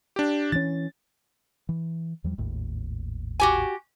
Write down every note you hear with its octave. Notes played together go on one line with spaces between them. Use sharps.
D4 G4
E3 C#4 A6
E3
E2 F3 G3
G#1 D#2 A2
F#4 G4 G#5